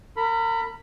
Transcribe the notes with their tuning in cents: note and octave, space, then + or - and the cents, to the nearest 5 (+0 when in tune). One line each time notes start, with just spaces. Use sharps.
A#4 -35 B5 +0